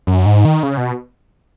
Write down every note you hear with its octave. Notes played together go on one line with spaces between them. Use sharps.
F#2
G#2
D#3
C#3
B2